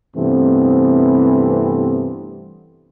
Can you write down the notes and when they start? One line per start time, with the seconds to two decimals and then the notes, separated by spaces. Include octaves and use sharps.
0.17 G2 C3 E3 A3 B3 C4